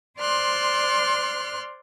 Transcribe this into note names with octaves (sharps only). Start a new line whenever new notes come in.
C5 D5 C6 F6 F#6